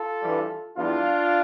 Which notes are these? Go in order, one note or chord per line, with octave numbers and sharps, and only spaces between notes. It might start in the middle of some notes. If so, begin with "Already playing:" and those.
Already playing: F4 A4
G2 E3 G3
E2 E3 G3 D4 F4